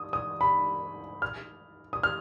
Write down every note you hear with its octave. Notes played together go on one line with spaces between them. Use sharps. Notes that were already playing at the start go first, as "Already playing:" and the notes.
Already playing: D#6
D#6
B5
F6
D#6
F6